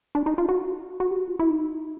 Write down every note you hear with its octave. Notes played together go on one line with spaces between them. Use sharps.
D4
D#4
F4
F#4
F#4
G4
F#4
F4
E4
D#4